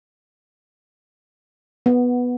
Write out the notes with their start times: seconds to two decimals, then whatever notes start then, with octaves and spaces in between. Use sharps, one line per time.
1.86 B3